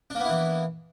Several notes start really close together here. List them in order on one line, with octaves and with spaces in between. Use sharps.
D4 A#3 B3 E4 E3